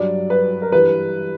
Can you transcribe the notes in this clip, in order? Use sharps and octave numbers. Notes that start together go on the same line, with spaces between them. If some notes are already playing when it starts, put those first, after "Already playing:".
Already playing: G2 F#3 D5
B4
A#4
G2 E3 G3 B4